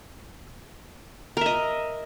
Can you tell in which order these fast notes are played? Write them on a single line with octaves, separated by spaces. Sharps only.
A#4 E5 D#5